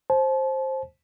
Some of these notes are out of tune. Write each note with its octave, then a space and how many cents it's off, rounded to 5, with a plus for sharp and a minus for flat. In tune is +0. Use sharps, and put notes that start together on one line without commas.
C5 +15 A5 -35